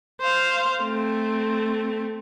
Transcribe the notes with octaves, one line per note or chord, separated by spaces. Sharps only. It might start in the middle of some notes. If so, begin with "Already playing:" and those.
C5 F5
A3 C4